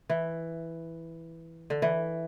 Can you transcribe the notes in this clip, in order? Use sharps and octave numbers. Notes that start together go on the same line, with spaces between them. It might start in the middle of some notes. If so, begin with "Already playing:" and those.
E3
D3
E3